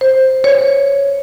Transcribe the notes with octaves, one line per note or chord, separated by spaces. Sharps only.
C5
C#5